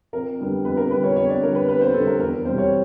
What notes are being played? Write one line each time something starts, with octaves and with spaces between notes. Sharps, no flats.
F2 A#4
D3 G3 B3
F2 B4
A#4
D3 G3 B3 B4
C#5
F2 C#5
D5
D3 G3 B3 A#4
B4
F2 B4
C5
D3 G3 B3 A4
A#4
E2 A#4
B2 G3 C4 C5
C#5